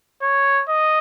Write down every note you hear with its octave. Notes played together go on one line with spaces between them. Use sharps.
C#5
D#5